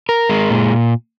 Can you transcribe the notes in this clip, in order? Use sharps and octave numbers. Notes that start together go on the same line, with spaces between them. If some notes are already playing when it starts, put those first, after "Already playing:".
A#4
G#3
A#2